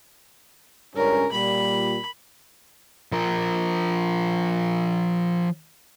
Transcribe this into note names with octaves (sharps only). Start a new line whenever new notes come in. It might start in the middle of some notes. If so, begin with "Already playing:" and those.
C#2 G2 C#4 A#4
A#2 G3 B5
F3 A#4